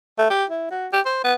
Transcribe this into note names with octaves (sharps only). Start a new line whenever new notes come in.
A3
G4
E4
F#4
G4
C5
B3